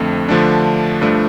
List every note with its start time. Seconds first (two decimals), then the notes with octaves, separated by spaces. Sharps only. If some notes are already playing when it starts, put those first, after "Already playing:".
Already playing: F2 D3 A3 C4
0.29 D3 F3 A3 D4
1.01 G2 F3 A3 D4